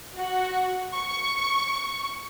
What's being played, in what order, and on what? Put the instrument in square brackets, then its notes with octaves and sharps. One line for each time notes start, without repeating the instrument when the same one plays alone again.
[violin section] F#4
C#6